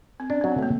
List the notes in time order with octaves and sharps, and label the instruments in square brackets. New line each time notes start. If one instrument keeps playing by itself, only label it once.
[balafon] C4
[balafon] C#4 [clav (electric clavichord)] D4
[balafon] C4
[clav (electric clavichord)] F#3
[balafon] C4
[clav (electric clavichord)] A3 [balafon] A#3